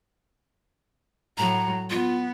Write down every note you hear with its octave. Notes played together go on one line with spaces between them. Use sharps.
A2 F#3 A#5
B3 F4